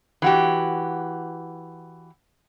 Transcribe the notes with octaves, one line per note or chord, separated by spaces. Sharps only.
E3 F#4 G4